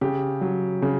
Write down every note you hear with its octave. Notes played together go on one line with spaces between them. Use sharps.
C#3 G4
F#3
C#3